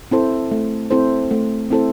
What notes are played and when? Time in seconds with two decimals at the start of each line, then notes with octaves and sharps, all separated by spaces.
0.11 C4 E4 A4 C5
0.51 A3
0.91 C4 E4 A4 C5
1.31 A3
1.70 C4 E4 A4 C5